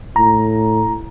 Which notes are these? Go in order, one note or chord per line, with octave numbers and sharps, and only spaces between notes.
A2 A#5